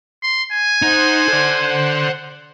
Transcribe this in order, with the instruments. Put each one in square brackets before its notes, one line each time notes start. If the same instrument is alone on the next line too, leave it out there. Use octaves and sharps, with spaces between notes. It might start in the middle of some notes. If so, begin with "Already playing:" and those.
[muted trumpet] C6
G#5
[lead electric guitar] D#4 [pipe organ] C5 F#5
[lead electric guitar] A4 D5